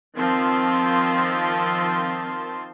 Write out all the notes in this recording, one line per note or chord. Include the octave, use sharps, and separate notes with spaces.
D#3 F3 C4 A5 C6